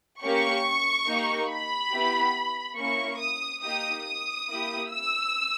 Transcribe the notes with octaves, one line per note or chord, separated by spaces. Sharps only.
A#3 C#4 G4 C#6
A#3 D#4 G4
B5
B3 E4 G4
A#3 C#4 E4 C#6
D#6
A#3 D#4 G4 D#6
D#6
A#3 E4 G4
E6